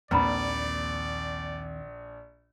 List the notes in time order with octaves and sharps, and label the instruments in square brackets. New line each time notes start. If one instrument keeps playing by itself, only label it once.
[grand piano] A#1 [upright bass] D#2 C4 [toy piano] B4 A#5 B5 [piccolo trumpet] D5